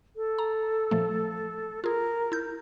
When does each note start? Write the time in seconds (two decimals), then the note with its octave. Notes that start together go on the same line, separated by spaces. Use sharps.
0.16 A4
0.38 A#5
0.91 A#2 F3 A3
1.84 F4 G#4 A#4
2.32 E4 G6